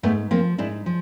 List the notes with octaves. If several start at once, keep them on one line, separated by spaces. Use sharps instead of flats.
G#2 A3 B3
F3 A#3 C4
G#2 D4 E4
F3